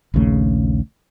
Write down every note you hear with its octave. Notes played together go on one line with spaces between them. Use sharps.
A#1 D#2 C#3 A3